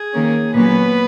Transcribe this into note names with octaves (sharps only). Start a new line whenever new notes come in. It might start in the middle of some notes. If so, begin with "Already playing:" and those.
Already playing: G#4
D#3 A#3 C#4
A#2 F#3 A#3 B3 C#4 B4